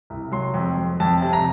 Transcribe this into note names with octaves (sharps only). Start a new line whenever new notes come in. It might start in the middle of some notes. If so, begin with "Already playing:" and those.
C2
F#3 C6
F2
F2
F2 A5
C3
A#5